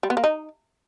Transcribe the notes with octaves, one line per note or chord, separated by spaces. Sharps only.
G3
B3
A#3
D#4